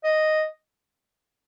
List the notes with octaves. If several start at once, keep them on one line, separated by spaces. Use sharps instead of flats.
D#5